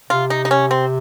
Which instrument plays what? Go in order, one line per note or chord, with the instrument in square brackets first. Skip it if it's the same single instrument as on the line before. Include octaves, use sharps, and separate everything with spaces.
[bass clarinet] C3 [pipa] F4
[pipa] D#4
D#4
C#4
C4